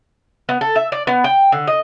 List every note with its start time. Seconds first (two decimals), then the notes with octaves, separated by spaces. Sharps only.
0.49 B3
0.61 A4
0.76 E5
0.92 D5
1.07 B3
1.24 G5
1.52 D3
1.68 D#5